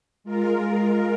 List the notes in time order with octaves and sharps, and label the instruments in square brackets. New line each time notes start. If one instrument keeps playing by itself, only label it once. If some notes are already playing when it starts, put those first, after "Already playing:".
[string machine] G#3 F4 A#4